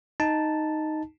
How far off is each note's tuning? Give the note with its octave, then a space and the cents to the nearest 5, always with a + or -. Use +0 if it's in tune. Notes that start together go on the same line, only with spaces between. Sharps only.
D#4 +0 A5 +0